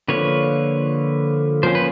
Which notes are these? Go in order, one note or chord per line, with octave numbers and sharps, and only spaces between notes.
D3 F3 A#3 B4 C#5
F3 A#3 C#4 C5
B4